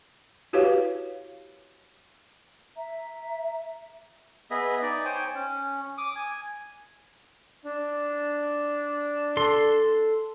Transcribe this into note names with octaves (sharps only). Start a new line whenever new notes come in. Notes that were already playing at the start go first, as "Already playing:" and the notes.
E4 F#4 G4 B4 C#5 F5
E5 A#5
B3 G#4 D#5 E5
D#4 D5
C5 C#5 G5 G#5
C#4
D6 D#6
G#5
D4
A4 C6